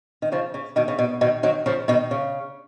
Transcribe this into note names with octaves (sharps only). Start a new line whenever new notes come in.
D#3
C#3 F3
C#3
B2 D#3
C#3
B2
B2 D#3
D#3 F#3
C#3 F3
B2 D#3
C#3